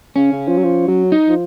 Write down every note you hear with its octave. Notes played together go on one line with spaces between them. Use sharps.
C#3 C#4
C#3
F3
F#3
F3
F#3
D#4
F3